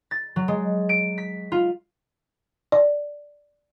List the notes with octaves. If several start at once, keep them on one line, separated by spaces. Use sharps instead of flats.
A6
F#3
G#3
D7
B6
F4
D5